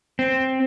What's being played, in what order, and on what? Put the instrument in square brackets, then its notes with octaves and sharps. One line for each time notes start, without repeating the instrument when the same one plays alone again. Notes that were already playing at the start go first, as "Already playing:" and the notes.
[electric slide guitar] C4